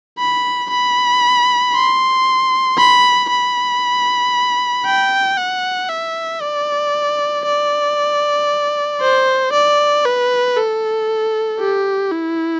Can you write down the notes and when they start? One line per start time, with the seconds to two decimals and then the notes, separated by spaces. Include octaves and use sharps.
0.19 B5
0.70 B5
1.74 C6
2.78 B5
3.30 B5
4.86 G5
5.38 F#5
5.89 E5
6.41 D5
7.46 D5
9.01 C5
9.53 D5
10.05 B4
10.57 A4
11.60 G4
12.11 E4